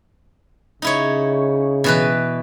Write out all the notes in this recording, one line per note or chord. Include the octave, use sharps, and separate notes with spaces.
C#3 D#4 E4 C#5
B2 E3 B4